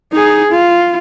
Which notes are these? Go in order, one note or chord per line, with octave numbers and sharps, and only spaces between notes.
D#4 G#4
F4